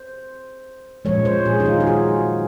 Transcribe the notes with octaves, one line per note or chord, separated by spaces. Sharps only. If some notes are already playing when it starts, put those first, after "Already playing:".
Already playing: C5
A#2 F3 G#3 C#5
C5
G#4
D#4
F4
G#4
F#4